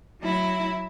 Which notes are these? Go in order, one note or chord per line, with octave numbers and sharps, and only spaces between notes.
F#3 E4